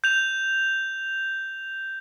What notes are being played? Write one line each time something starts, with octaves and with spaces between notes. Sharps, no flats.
G6 F7